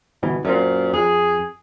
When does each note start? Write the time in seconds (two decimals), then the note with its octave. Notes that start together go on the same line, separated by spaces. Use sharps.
0.23 G1 B2 E3
0.45 F#2 A#2 C4
0.93 F2 G#4